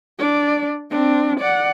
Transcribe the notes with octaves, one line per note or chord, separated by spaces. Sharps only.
D4 D5
C4 D4
D5 F#5